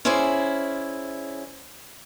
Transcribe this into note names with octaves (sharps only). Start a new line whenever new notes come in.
C#4 E4 G#4 C5 D5